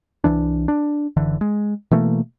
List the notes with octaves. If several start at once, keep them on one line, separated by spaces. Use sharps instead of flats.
C2 F2 E3 D4
D4
F#1 D3 E3
G#3
B2 E3 A3 A#3